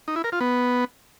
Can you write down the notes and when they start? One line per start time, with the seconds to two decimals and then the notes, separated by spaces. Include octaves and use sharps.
0.08 D#4
0.16 E4
0.24 A#4
0.32 F4
0.40 B3